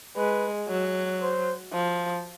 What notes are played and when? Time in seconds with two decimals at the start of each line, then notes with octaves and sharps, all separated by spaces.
0.16 G#3 B4
0.68 F#3
1.21 C5
1.73 F3